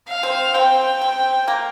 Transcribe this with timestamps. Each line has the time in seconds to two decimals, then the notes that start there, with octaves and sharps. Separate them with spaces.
0.08 F5
0.23 C4
0.54 C4 G5
1.01 C4
1.48 A#3